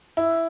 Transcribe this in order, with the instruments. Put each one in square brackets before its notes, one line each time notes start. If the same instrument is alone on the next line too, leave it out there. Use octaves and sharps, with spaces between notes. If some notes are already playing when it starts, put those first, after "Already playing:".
[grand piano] E4